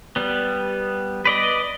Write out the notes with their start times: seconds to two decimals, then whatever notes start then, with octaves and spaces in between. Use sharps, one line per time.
0.16 G3 B3
1.25 B4 D5 D#5